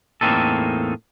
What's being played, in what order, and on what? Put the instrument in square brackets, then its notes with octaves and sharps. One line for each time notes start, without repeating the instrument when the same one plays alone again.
[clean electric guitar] E2 A2 A#3 C4 D#4 A4